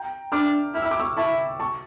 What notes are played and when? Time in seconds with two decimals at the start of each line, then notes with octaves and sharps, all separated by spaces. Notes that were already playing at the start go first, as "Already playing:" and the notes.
Already playing: G5 A#5
0.32 D4 D6 F6
0.74 E4 F6
0.82 E6
0.91 D6
1.00 C#6 E6
1.17 E4 A5 C#6
1.60 A5 C#6